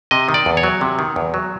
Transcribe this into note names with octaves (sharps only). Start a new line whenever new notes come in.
C3 D#5
D#3
D5
E2
C#5
F#3
C3
D#3
E2
F#3